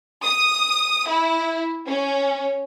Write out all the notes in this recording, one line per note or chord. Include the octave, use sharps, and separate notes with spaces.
D#6
E4
C#4